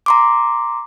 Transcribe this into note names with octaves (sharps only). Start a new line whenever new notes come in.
A#5 C6 D6